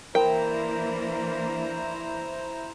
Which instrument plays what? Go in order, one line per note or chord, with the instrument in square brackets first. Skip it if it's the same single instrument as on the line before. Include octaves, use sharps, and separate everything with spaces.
[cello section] E3 A#3 D4 [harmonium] E4 C5 A#5 [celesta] A#4 [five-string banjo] G5